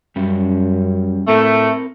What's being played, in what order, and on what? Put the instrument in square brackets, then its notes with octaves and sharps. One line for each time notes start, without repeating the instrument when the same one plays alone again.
[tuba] F#2 [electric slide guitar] G3 C#4
[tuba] A2 [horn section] A3 [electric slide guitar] C4 A#4